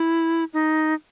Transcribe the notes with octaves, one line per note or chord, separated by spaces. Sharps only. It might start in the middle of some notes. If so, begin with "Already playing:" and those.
Already playing: E4
D#4